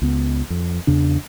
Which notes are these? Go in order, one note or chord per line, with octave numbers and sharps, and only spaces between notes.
C#2 B3
F2
E2 C#3 D4